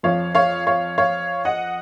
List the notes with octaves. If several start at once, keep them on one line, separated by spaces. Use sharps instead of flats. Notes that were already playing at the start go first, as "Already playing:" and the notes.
F2 F3 C#5 F5
C#5 F5
C#5 F5
C#5 F5
D#5 F#5